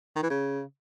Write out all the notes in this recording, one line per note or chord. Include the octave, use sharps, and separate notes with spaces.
D#3
E3
C#3